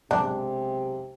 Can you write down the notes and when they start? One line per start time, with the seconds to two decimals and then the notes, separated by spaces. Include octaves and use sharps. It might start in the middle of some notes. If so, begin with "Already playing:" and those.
0.11 B1 C3 G#3 D4